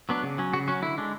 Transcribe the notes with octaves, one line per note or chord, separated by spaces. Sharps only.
F#3 B3 D4
C#3
F#3 C#4
C#3 F#4
F#3 C#4 F#4
D3 E4
G#3 D4